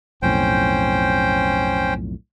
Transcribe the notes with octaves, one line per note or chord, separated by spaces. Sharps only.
B1 F2 A2 C#4 C5 G5